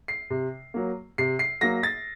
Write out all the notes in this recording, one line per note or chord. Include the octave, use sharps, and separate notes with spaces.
C7
C3
F#3 A#3
C3 C7
C7
F#3 A#3 A#6
A6